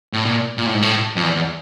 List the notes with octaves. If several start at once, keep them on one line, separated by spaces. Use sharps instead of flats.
A2
A#2
A#2
A2
G#2
A2
F2
E2
E2